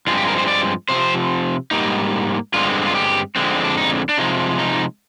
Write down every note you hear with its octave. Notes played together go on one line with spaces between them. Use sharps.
G2 F3 G#3 C4 F4
G4
A#4
C5
D5
C3 F3 C4 C5
G#2 G3 A#3 D#4
G2 D3 G#3 C4 F4
F4
G4
F2 D3 G#3 C4
D4
D#4
D4
C3 F3 G#3 D#4
D#4